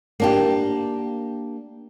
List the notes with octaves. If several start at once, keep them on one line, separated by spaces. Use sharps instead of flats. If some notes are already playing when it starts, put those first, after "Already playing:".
A#3 D4 G4